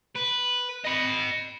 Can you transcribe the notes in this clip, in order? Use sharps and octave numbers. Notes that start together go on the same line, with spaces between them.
B4
D#5 B5